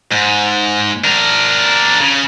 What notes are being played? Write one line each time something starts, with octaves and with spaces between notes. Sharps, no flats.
G#2
D4 A#4
C#3